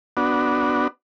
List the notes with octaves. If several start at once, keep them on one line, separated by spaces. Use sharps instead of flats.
B3 D4 F#4